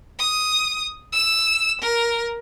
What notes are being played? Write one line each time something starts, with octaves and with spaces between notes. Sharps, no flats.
D#6
E6 E7
A#4